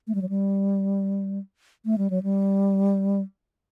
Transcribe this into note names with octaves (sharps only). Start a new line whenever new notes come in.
A3
G3
F#3
G3
A3
G3
F#3
G3